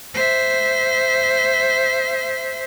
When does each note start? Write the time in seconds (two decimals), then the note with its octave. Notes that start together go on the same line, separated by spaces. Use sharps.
0.14 C5 E5